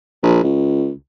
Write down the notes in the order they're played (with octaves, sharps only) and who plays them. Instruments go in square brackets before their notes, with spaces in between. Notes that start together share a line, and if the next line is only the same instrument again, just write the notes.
[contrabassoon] A#1
C#2